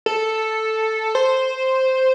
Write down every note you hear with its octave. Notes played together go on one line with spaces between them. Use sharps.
A4
C5